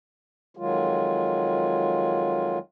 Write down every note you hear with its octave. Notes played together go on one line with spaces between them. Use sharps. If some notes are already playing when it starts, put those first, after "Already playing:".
F2 D#3 F#3 G#3 F4